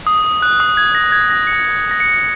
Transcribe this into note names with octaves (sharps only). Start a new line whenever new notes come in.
D#6
F#6
D#6
G#6
A#6
G#6
A#6
C#7
A#6
A#6
C#7